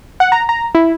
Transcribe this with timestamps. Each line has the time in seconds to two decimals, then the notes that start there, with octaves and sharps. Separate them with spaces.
0.20 F#5
0.32 A#5
0.49 A#5
0.75 E4